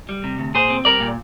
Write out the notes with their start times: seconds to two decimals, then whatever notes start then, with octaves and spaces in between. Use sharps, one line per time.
0.09 G3
0.24 C3
0.38 D2
0.54 A#2 G#4 C5
0.70 C4
0.85 G3 A#4 D5
1.00 A#2